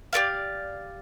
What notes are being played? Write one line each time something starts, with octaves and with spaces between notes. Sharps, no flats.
G4 A#4 D5 F5